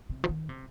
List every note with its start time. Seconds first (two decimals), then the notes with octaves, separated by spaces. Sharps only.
0.10 C3
0.24 F3
0.29 D#3
0.49 C3